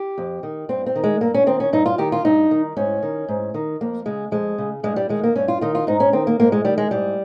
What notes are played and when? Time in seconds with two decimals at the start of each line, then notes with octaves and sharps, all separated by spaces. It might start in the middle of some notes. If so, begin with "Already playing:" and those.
Already playing: G4
0.18 F2
0.43 D#3
0.69 G2 C4
0.86 C4
0.96 D#3
1.04 G#3
1.21 G2 A#3
1.34 C#4
1.47 D#3 C4
1.60 C#4
1.73 G2 D#4
1.86 F4
1.98 D#3 G4
2.12 F4
2.25 G2 D#4
2.51 D#3
2.77 G#2 C#4
3.03 D#3
3.28 G#2
3.54 D#3
3.81 F2 A#3
4.06 C#3 G#3
4.31 F2 G#3
4.58 C#3
4.83 G2 G#3
4.96 G3
5.09 D#3 G#3
5.23 A#3
5.36 G2 C#4
5.48 F4
5.61 D#3 F4
5.75 F4
5.87 G#2 D#4
6.00 C#4
6.13 D#3 C4
6.27 A#3
6.40 G#2 A#3
6.52 G#3
6.65 D#3 G3
6.78 G#3
6.91 G#2 G3